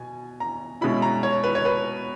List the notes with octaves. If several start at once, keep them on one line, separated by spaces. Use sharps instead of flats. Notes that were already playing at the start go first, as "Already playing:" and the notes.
Already playing: B2 G#5
A#5
B2 G#3 C#4 E4 B5
A#5
C#5
B4
C#5
B4